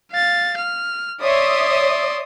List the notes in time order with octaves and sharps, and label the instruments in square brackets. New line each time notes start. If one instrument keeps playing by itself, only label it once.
[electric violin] F5 A6
F6
[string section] C#5 E5 D#6 [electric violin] D5 C6